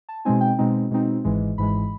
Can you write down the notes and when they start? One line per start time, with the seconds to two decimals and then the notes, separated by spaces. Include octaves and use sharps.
0.09 A5
0.25 B2 G#3 C4 D#4 G#5
0.41 G5
0.59 B2 G#3 C4 D#4
0.91 B2 G#3 C4 D#4
1.24 G#1 G#2 E3 G#3
1.58 G#1 G#2 E3 G#3 B5